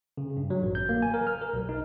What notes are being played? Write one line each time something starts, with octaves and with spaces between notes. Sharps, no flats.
C#3
G2
F#3
A1
G6
A#3
G#5
A#4
F6
A#4
B1
D#4